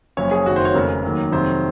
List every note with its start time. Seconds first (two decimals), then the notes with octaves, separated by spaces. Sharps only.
0.17 F#1 F#2 F3 C#5
0.31 G#4
0.46 F#1 F2 D#3 F#4
0.56 C5
0.65 C#5
0.74 F1 F2 C#3 A#4
1.03 D#2 D#3 F#3
1.32 F2 C3 D#3 F#3 C5